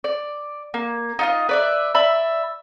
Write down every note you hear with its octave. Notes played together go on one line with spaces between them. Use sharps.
D5
A#3
D#4 F4 D#5
B4 D5 E5
D5 E5 B5